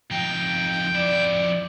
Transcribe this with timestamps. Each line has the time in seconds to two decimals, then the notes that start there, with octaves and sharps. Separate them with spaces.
0.11 F2 D#4 G5
0.95 F2 E4 D5